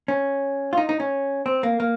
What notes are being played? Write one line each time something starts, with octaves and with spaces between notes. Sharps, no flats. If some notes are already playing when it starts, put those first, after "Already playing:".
C#4
F4
D#4
D#4
C#4
C4
A#3
A#3